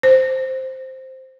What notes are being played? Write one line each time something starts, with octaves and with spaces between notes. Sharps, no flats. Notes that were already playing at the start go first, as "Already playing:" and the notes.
C5